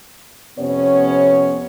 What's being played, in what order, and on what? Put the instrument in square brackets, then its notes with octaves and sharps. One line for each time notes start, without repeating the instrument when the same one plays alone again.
[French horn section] F2 C3 B3 C#4 C#5